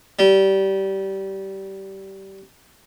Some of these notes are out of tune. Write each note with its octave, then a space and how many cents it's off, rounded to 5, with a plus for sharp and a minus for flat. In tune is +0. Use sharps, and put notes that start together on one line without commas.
G3 -20